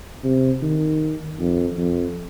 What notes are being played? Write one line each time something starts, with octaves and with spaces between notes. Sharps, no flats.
C3
D#3
F2
F2